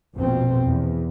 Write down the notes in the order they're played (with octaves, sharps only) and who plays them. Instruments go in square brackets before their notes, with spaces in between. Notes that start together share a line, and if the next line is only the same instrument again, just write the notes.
[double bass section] A#1 F2 B2 C4
E2